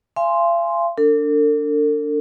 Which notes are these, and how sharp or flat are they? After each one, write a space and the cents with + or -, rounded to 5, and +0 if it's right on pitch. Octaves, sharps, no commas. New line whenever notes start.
F5 -40 G#5 +0 C6 +0
D4 -10 A4 +45